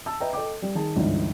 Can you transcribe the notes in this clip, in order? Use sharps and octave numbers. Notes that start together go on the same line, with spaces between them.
A5 E6
B4 D#5 E5 G5 A#5
A4 D#5 G5 D6
G3
D#3 G#4 A5
G1 C#2 D3 E3 D#4